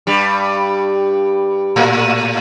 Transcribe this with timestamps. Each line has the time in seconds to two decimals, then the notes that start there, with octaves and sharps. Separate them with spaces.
0.07 G2 G3
1.76 A2 A3